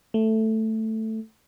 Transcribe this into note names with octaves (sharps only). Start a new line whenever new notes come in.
A3